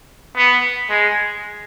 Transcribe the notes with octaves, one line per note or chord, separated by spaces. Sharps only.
B3
G#3